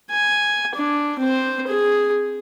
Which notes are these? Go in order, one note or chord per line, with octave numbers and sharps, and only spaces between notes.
G#5
D4
C4 C5
G#4